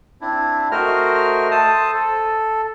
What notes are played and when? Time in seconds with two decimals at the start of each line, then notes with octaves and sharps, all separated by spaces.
0.21 C4 D4 E4
0.71 A3 F#4 A#4 C5 D#5 F6
1.51 A4 C5 A5 D#6
1.94 A4